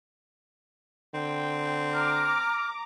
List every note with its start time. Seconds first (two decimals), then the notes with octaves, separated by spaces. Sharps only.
1.14 D3 C4 G5
1.94 A#5 D6 F6